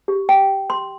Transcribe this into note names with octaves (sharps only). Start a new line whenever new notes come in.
G4
G5
C6